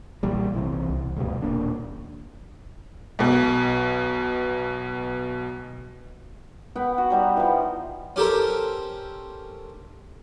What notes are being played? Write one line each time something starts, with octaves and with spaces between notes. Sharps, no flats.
B1 A#2 E3 G3
B1 C3 E3
C2
D2 G2 B2
D#1 F2 A#3 D4
B1 B2
B3 F#5 G5
F#4
F#3 G3 D#4
E3 F3
C#4 G4 A4 A#4 C5